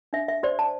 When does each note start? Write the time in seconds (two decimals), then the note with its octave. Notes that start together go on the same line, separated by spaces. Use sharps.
0.13 D4 E5
0.28 E5
0.43 G4 C5 D5
0.59 A5